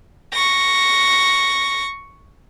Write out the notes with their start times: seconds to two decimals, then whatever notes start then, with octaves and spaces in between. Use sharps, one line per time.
0.34 C#6 A#6